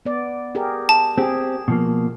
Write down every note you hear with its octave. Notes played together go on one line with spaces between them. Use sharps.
B3 D5
G4 G#4 A#4
A5
C4 G4 G#4
B2 F3 A#3